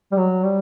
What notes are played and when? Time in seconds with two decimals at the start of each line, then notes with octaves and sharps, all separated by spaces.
0.12 G3
0.18 F#3
0.44 G3